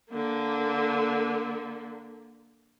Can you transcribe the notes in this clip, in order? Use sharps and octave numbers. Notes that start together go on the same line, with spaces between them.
D3 A#3